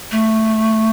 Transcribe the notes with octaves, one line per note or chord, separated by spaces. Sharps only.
A3